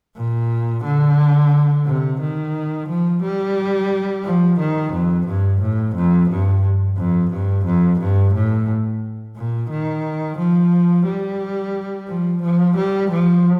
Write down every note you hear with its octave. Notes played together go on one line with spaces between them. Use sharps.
A#2
D3
C3
D#3
F3
G3
F3
D#3
F2
G2
A2
F2
G2
F2
G2
F2
G2
A2
A#2
D#3
F3
G3
F3
F3
G3
F3